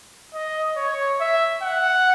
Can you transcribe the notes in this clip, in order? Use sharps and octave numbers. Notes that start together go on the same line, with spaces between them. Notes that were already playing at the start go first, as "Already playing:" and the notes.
D#5
C#5
E5
F#5